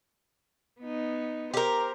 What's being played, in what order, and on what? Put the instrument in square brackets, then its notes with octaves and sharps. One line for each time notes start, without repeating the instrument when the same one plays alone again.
[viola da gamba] B3 D#4
[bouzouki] G4 A#4 [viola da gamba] C5